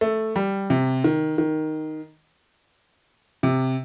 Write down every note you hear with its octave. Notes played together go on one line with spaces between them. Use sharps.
A3
G3
C3
D#3
D#3
C3